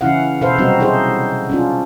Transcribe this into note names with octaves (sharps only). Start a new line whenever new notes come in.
C#3 E3 C#4 E4 F5 F#5
B2 A4 B4 C5 F5
C3 F#3 G3 C4 D#4 F#4
D#4 E4 G#4 A4 C5
C#4 D4 F4